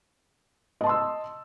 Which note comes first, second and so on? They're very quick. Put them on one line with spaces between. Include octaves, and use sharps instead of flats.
D#5 A5 C6 E6